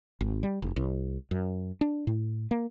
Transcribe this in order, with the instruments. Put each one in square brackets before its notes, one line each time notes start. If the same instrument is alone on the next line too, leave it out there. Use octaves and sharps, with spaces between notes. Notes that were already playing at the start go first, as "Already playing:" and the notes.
[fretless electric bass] G#1
G3
F1
C2
F#2
D4
A2
A#3